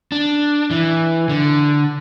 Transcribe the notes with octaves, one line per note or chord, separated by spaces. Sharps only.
D4
E3
D3